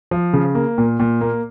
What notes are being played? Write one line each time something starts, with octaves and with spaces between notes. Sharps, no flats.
F3
C#3
A#3
A#2
A#2
A#3